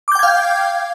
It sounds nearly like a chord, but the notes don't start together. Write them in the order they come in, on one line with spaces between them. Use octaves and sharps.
D6 G6 G5 G#6 F5